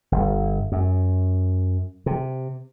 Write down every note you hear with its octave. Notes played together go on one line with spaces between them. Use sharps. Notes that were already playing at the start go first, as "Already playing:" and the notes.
G1
F#2
C3